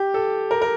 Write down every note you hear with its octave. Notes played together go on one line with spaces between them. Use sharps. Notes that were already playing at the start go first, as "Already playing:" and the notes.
Already playing: G4
A4
A#4
A#4